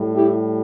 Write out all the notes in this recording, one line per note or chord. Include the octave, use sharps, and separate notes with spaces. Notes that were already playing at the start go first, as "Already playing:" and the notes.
Already playing: A2 G3
E4 G4